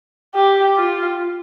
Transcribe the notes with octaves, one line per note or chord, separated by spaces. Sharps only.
G4
F4